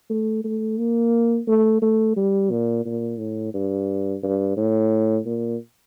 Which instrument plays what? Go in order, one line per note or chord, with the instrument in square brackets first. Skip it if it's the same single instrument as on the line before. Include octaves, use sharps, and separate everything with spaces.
[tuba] A3
A3
A#3
A3
A3
G3
A#2
A#2
A2
G2
G2
A2
A#2